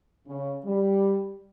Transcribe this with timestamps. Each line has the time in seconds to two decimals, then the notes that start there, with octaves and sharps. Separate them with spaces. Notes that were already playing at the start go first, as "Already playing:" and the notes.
0.27 C#3
0.64 G3